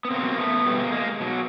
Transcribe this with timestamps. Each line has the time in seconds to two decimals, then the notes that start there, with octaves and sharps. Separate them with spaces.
0.05 B3
0.10 B2 F#3 A#3 C4
0.38 A3 B3
0.65 B2 F#3 G3 A3
0.78 G#3 A#3
0.92 G#3 A#3
1.20 B2 F#3